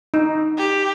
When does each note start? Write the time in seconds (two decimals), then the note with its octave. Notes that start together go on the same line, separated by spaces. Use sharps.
0.14 D#4
0.57 G4